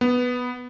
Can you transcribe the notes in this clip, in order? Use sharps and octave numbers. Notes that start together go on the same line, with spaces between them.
B3